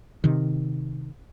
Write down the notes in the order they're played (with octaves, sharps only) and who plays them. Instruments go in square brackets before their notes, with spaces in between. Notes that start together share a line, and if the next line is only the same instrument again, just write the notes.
[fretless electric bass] C3 D#3